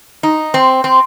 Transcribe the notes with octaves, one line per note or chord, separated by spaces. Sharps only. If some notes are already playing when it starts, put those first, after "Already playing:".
D#4
C4
C4